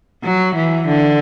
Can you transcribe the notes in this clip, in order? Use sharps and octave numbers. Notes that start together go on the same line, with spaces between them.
F#3
E3
D3